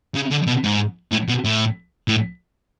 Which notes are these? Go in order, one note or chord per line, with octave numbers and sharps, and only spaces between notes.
C#3
D3
B2
G#2
A2
B2
A2
A2